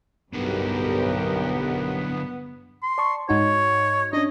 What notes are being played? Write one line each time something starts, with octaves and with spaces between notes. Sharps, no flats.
B1 G2 D3 F#3 B3 G4 A#4
C6
D5 A5 C#6
G#2 D#4 F#4 C#5
C#4 D4 D#5